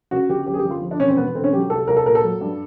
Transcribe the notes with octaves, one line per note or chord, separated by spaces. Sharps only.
C#3 F#4
G1 G4
F#2 G4
G#4
G4
G1
F4
F3
D4
E1 C#4
C4
E1 B3
D3 C4
C#4
F#3 G4
C2 A4
C2 A#4
A4
A#2 A#4
A4
F#3
G2